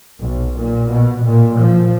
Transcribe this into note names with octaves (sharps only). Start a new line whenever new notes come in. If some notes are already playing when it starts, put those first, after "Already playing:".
B1
A#2
B2
A#2
F3